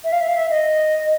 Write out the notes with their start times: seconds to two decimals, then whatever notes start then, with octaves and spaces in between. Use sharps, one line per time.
0.04 E5
0.12 F5
0.21 E5
0.28 F5
0.36 E5
0.50 D#5